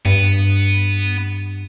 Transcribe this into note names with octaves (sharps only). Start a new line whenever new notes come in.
G2 B3